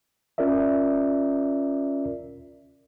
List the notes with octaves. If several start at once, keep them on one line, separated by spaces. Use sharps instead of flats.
C#4 F4 A#4 D5 E5